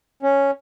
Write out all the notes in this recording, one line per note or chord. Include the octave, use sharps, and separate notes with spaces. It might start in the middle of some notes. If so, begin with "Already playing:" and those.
C#4